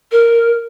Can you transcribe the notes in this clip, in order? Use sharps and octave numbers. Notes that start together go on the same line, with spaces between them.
A#4